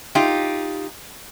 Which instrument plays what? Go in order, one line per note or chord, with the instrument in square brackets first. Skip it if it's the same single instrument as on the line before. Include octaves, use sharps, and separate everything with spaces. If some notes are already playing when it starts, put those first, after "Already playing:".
[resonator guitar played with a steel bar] D#4 F4 G4